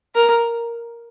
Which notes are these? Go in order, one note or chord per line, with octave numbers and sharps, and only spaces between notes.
A#4